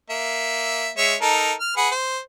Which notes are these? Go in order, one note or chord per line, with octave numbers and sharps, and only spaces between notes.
A#3 E5
G#3 C#5 E5
D#4 A4 A#4
F6
G#4 B4 F#5
C5